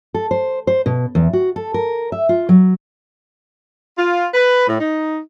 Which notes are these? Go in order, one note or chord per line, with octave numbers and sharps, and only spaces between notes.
A4
C5
C5
B2
E2
F#4
A4
A#4
E5
F4
F#3
F4
B4
A2
D#4